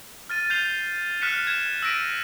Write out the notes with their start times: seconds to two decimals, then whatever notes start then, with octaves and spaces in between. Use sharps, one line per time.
0.29 F6 A6 D#7
0.50 G6 C7 D#7 F7 G7
1.21 F6 F#6 B6 C#7 E7
1.47 F#6 G#6 E7
1.82 E6 A#6 B6 D7 D#7